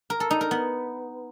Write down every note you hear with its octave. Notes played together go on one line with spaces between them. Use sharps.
A#4
A4
D#4
A#4
B3